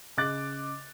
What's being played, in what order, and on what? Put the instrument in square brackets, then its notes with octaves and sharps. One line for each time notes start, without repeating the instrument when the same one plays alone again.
[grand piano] C#3 D#5 D6 F#6 A6